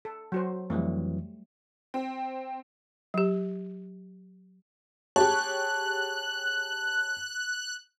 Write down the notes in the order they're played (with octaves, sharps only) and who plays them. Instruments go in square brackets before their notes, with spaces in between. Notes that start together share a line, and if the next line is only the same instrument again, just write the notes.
[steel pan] A4
F#3 F#4 C5
[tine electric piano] F2 E3 F#3 [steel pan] G3 A3
[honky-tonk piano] C4
[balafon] F#3 G4
[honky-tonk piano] G4 G#4 C#5 [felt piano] A5 [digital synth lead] F#6